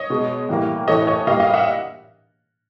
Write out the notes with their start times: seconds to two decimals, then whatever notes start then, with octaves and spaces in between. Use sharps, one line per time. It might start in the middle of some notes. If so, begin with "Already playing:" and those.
Already playing: C#5 D#5
0.10 B2 G#3
0.49 A2 E3 G3 A#3
0.88 A2 E3 A3 C#5 D#5
1.07 C#5 D#5
1.27 A#2 G3 A#3 D#5 F5
1.40 D#5 F5
1.54 E5 F#5